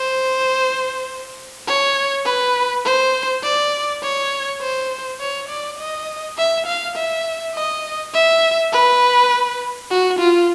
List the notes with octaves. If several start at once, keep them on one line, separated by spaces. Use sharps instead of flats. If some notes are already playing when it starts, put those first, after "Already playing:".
Already playing: C5
C#5
B4
C5
D5
C#5
C5
C#5
D5
D#5
E5
F5
E5
D#5
E5
B4
F#4
F4